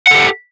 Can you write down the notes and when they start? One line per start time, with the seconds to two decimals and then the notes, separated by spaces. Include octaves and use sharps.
0.07 F#5
0.11 A4
0.14 G4